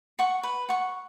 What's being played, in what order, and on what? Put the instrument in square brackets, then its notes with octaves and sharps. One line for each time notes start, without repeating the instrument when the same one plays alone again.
[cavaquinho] F#5 C#6
B4
F#5 C#6